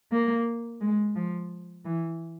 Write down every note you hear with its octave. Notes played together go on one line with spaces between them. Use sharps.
A#3
G#3
F3
E3